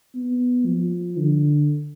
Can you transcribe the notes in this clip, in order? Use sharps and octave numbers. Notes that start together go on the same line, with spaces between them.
B3
F3
D3